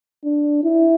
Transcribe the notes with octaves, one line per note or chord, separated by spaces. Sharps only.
D4
E4